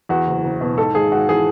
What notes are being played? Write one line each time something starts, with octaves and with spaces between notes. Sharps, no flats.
E2 F#4
F#1
F#1
B2
G#2 A4
G#1 G#4
G#1 F#4
E3 G#4